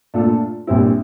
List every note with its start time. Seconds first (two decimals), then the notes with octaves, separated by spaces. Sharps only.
0.14 A#2 A3 D4 F4 A4
0.67 A#1 A#2 G3 C4 E4